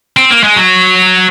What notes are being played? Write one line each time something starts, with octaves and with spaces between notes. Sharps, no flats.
C4
A#3
G#3
F#3